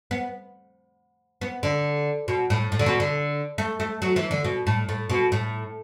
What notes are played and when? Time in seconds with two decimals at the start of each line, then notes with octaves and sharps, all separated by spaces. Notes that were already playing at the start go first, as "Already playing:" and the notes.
0.11 B3
1.41 B3
1.63 D3
2.28 B2
2.50 A2
2.72 A2
2.79 D3
2.86 B2
3.00 D3
3.58 A3
3.80 A3
4.02 F#3
4.16 E3
4.31 D3
4.44 B2
4.67 A2
4.89 A2
5.09 B2
5.32 A2